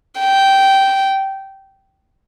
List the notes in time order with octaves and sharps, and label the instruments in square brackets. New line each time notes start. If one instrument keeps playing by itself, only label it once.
[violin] G5